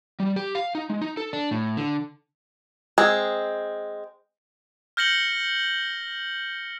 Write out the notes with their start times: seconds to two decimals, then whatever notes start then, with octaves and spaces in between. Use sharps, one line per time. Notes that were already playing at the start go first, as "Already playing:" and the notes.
0.20 G3
0.36 G4
0.55 F5
0.75 D#4
0.90 G#3
1.01 D#4
1.17 A4
1.33 D4
1.51 A2
1.77 D3
2.98 G#3 C4
4.97 F6 G6 A#6 C#7 F#7 G7